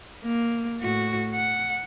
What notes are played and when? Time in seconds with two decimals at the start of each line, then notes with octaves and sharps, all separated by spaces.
0.24 A#3
0.81 A2 F#4
1.34 F#5